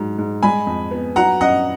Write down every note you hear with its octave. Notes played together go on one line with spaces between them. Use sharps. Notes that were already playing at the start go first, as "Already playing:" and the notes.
Already playing: G#2 F#3
G#2
G#3 G#5 B5
F2
B3
F#3 F#5 A#5
F#2 D#5 F#5